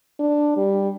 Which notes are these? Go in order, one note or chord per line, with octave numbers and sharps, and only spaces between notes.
D4
G3